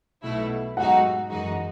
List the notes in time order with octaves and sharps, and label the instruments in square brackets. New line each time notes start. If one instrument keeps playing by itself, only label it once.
[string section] B1 B2 A3 E4
[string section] G#2 F#3 A3 D#4 F#4 [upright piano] F#5
[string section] F#2 E3 G#3 D#4 F#4